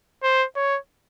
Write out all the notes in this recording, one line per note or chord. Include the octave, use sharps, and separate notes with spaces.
C5
C#5